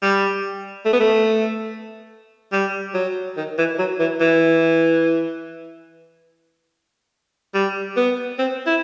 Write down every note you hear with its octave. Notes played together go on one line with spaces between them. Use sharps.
G3
A3
B3
A3
G3
F#3
D#3
E3
F#3
E3
E3
G3
B3
C4
E4